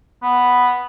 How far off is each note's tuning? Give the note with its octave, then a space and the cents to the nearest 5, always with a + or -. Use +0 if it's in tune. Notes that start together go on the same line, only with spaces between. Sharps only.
B3 +0